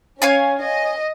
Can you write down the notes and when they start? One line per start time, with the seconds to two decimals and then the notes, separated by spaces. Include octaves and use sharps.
0.22 C#4 C#5 F5 G#5
0.63 D#5